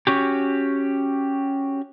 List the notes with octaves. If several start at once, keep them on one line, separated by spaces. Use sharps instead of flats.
C#4 F#4 G4